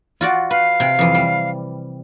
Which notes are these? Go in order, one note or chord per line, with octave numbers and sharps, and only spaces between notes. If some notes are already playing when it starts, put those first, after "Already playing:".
F4 F#4 D5
B4 F5
C3 G5
F2 E3
G3